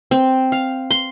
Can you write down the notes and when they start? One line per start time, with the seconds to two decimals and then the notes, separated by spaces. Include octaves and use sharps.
0.11 C4
0.52 F5
0.91 C6